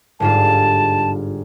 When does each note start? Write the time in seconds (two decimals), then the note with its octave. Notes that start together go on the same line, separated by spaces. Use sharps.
0.20 G1 G#2 F4 A5